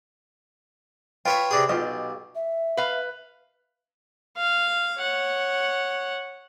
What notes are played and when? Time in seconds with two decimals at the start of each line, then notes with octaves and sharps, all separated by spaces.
1.25 F4 B4 C#5 E5 G5
1.51 C3 D4 G#4
1.69 B1 F4 G4 D#5
2.35 E5
2.77 B4 F5
4.37 F5
4.98 C#5 F#5